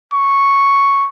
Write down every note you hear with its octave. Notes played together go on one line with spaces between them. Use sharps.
C#6